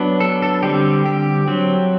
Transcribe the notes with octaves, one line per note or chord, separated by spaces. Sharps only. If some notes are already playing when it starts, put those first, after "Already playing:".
Already playing: F#3 B3 D4
A4
A4
D3 G3 C4 G4
G4
F#3 C4